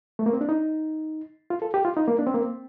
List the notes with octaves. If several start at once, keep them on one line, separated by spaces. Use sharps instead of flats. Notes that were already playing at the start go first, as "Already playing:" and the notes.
A3
A#3
C4
D4
D#4
F4
A4
G4
F4
D#4
A#3
D4
C4
A#3
C4